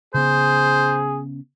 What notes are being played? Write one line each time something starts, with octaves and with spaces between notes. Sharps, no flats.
C#3 B3 G#4 C5